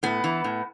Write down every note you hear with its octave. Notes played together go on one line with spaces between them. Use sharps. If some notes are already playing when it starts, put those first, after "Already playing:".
A2 B3
E3
A2